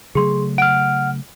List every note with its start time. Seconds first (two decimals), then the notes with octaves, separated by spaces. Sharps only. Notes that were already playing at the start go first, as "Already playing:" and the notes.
0.15 C#3 F#3 A3 G#4 C6
0.58 F#5 F6 D7